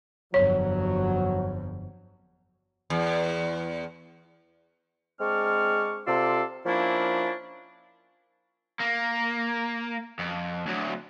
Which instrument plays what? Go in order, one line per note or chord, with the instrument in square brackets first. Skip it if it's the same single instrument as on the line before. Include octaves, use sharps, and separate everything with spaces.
[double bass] G1 F2 [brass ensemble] F#3 [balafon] C#5
[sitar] E2
[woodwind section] G#3 C4 D4 C#6 F6
C3 F4 A4 D5 C6 E6
F3 A#3 C#4 D4 E4
[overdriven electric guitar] A#3
F2
D2 F#3